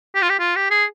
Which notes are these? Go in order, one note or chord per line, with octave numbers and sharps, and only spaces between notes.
G4
F4
G4
F4
G4
G#4